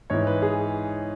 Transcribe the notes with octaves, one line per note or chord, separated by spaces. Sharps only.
G#2 E3 C#5
B4
G#4